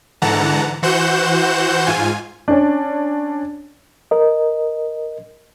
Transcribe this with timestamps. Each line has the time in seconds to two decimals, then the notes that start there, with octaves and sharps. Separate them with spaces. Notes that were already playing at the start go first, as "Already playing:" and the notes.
0.22 G#2 D3 E3 F#5 A5 A#5
0.82 E3 F#4 C5 F#5 G6 E7
1.87 G#2 F4 G#5
2.48 C#4 D4
4.11 A#4 D#5